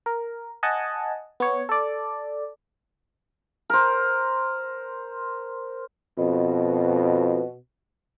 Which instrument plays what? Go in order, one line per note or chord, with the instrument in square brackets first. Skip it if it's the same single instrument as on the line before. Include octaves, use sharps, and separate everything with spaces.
[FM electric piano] A#4
D#5 F#5 G#5 A5
B3 C#5
A4 D5
[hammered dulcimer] A#4 C5
[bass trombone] F2 [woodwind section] B2